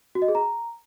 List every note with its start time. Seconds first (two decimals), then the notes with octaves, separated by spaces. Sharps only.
0.15 F#4
0.22 D#5
0.28 G#4
0.35 A#5